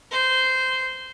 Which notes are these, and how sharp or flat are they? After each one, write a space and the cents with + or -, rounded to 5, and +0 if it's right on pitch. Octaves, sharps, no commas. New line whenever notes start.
C5 -15